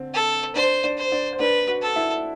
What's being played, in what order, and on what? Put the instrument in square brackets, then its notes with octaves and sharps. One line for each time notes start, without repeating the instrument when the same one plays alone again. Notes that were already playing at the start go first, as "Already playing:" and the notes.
Already playing: [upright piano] D3 C4
[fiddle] A4
[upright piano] D4 D5 [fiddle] C5
[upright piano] D4 D5
[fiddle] C5
[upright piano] D4 D5
C5
[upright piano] D4 D5 [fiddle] B4
[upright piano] F#4 F#5
[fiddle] A4
[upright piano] E4 E5